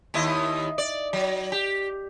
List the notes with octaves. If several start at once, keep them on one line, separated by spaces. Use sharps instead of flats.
D#2 E4 D#5
D5
F#3
G4